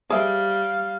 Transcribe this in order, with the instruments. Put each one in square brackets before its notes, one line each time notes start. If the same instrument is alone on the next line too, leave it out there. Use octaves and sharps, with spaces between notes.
[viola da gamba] G3 [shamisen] G#4 C5 E5 [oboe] F5